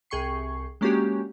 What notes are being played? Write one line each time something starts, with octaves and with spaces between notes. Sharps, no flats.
C2 G#4 G5 C#6 C7
G#3 A#3 C#4 D4 F#4 G4